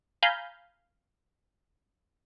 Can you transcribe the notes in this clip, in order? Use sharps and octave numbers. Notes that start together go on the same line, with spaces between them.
F5 G#5 A#5 B5 G6